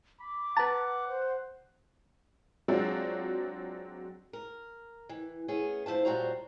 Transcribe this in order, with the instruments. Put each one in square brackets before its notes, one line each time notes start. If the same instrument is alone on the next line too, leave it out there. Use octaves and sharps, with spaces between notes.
[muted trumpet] B5 [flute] D6
[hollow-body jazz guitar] B4 A#5 [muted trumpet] F#5 [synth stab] A5
[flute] C5
[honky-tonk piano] F#3 G#3 C4 D4 F4 F#4
[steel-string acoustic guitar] A#4
E3
A3 B3 C#4 G#4
F3 E4 C5 A5
A#2 G3 F#4 C5 C#5 A#5